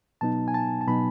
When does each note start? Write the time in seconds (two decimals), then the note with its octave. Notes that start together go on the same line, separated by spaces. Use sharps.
0.21 B2 F#3 B3 D#4 A5
0.48 G#5
0.54 A5
0.81 A5
0.88 B2 F#3 B3 D#4 B5